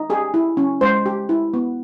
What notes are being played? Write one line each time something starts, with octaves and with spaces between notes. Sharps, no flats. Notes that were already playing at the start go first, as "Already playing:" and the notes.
Already playing: D#4
G4 G#4
E4
C#4
G#3 C5
G4
E4
B3